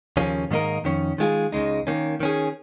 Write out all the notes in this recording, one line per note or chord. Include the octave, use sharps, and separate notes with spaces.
D#2 C#3 F3 A#3 C#4
G#2 D#3 A#3 D#4 A#4
F2 D#3 C#4
D#3 G#3 F4 G#4
C#2 C#3 G#3 D#4
D#3 A#3 C#4
D#3 C#4 G#4